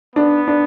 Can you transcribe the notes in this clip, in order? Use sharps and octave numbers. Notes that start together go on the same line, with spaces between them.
B3 D4
D4